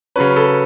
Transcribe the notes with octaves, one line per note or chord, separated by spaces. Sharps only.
C#3 F#3 C#4 B4
A4